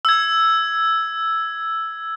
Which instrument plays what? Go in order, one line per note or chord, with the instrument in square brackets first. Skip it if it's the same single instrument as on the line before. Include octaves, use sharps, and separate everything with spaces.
[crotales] E6 G#6